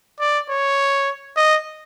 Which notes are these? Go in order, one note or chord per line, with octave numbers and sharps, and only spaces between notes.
D5
C#5
D#5